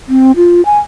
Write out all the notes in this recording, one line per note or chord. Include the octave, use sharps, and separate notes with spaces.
C4
F4
G#5